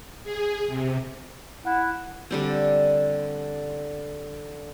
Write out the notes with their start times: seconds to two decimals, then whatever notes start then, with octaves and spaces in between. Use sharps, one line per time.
0.24 G#4
0.68 C3
1.65 E4 F#5
2.31 D3 G3 C4